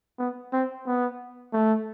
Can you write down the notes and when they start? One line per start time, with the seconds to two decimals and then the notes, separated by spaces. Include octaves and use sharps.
0.19 B3
0.53 C4
0.87 B3
1.53 A3